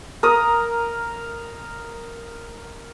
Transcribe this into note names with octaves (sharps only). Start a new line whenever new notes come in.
A#4 D#6